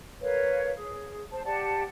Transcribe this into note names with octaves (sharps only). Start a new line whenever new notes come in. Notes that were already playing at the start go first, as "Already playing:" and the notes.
A#4 B4 C#5 F5
G#4
C5 A5
G4 D5 F#5 A5